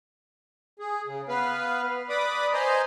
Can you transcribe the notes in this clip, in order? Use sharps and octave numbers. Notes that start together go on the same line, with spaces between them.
G#4
C#3
B3 B4 F5
B4 D5 B5 D6 D#6
C5 D#5 G#5 A#5 C6